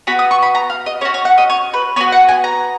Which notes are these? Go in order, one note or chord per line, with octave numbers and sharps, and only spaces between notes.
B3 F#4 B5
D#6
C#6
B5
A#5
F5
D#5
C#4 F#4 C#5
C#5
F#5
D#5
C#5
B4
B3 F#4 C#5
F#5
G#5
A#5